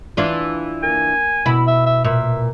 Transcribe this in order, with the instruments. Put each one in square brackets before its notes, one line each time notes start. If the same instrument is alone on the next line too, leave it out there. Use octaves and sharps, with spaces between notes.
[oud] E3 D4 F4
[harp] A#3 A#4 [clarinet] G#5
[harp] B2 E6 [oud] E4
[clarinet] E5
E5
[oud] A#2 [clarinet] E5